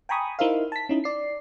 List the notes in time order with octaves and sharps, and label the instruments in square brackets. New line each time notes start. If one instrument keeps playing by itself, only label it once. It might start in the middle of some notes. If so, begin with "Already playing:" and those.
[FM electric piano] G5 G#5 A#5 B5 C#6 D#6
D#4 E4 A#4 C5 E5 F5
A5 B6
C#4 D#4 E4
D5 C7